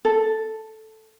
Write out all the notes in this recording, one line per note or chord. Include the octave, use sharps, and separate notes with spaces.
A4